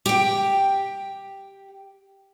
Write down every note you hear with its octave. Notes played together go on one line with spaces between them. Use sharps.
G4 G5